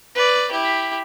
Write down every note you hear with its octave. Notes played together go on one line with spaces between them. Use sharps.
B4 D5
E4 G4